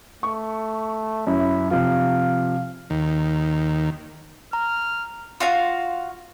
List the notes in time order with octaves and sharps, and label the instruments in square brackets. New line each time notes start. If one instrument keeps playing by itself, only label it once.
[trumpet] A3 [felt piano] C#6
[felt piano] F#2 [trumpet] E4
[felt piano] C3 F3 [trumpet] F5
[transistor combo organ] D#2
[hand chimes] A#5 [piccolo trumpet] F6
[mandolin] F4 F#4 F5